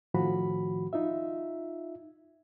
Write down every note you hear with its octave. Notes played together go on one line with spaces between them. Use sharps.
A2 D#3 F3 F#4 B5
D#4 F4 E5